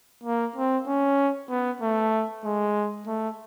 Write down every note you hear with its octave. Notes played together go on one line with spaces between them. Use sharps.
A#3
C4
C#4
B3
A3
G#3
A3